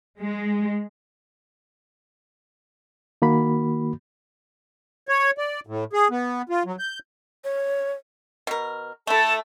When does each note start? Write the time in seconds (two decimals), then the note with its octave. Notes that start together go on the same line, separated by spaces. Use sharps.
0.19 G#3
3.22 D#3 A#3 F#4 B5
5.09 C#5
5.38 D5
5.67 A2
5.93 G#4
6.11 B3
6.49 F4
6.65 F#3
6.79 G6
7.44 C#5
8.47 B2 A#4
9.07 A3 E4 A4 A5